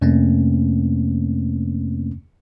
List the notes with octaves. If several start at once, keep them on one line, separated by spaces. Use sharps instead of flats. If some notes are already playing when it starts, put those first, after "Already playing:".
F2 C3 A3 A#3 C4 C#4